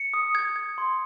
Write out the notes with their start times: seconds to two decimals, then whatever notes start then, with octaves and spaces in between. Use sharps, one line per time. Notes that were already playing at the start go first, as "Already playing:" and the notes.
Already playing: C#7
0.14 D#6
0.35 G#6
0.56 G#6
0.78 C6